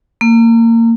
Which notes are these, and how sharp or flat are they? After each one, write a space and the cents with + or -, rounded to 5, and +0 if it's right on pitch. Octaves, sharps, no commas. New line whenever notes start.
A#3 -25